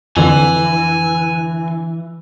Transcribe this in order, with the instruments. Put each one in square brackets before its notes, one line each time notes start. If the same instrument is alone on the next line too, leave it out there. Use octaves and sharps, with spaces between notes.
[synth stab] F2 D3 [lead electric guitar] E3 [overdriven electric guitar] G#5